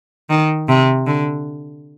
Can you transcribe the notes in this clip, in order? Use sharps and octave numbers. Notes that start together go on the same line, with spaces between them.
D#3
C3
D3